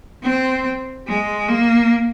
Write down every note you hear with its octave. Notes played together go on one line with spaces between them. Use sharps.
C4
G#3
A#3